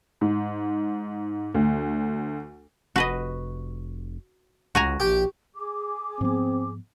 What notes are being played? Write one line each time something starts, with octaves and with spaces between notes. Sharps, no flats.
G#2
D2
F1 F#4 B4 D#5
C#2 F#4 G#5 A#5
A#1 G4
G#4 D6
G#2 F3 B3 C4